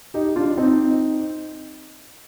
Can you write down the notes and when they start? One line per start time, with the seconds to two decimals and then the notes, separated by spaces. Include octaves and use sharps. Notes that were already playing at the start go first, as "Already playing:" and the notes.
0.14 D#4 G4
0.36 D4 F4
0.57 C4 D#4